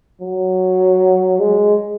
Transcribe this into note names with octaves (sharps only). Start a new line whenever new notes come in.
F#3
G#3